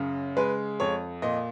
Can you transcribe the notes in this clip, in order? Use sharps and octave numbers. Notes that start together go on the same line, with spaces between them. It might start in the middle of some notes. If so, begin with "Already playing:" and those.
Already playing: F#2 C#3
G#3 B4
F2 C#5
A#2 D#5